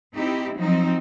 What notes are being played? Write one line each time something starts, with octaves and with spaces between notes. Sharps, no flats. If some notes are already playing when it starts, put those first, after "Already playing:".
C4 D#4 E4 G4
F3 F#3 C4 D#4